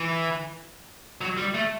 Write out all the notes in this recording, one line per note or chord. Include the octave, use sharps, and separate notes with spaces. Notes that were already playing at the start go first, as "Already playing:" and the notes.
Already playing: E3
F#3
G3
A3